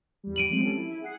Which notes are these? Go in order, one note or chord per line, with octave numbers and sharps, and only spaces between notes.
E2 G3
D7 D#7 F#7
F3 G#3 C4
C#4 G4 A4
E4
G#4 F#5 C7